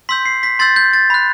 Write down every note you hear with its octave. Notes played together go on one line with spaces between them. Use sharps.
C6 E6 G6 B6
C7
B6
C6 E6 G6 A6
G6
A6
B5 F#6